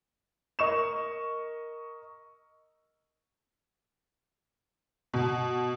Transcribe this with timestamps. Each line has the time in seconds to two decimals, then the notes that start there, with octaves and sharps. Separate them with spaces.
0.59 A#4 D#5 C#6 E7
5.14 B2